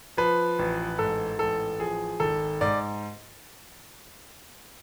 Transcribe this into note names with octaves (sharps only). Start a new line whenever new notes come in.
F3 B4
A1
G#2 A4
A1 A4
F3 G#4
G#1 A4
G#2 D5